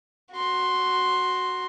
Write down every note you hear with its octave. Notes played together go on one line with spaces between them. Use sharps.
F#4 C6